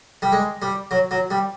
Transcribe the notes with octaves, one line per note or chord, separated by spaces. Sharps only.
G3
G#3
G3
F#3
F#3
G3